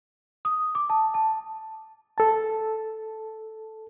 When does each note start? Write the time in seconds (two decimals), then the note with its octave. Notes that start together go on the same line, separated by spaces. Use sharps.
0.45 D#6
0.75 D6
0.90 A5
1.14 A5
2.18 A4 A5